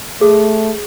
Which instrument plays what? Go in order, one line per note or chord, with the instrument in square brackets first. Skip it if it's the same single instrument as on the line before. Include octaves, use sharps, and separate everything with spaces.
[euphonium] A3 [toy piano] G#4